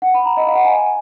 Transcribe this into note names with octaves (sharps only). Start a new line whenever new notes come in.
F#5
B5
A#5
D#5
F5
F#5
G#5